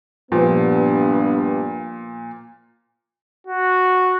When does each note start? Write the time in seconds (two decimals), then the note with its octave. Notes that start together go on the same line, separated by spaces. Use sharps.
0.32 G2 A#2 F3 B3
3.47 F#4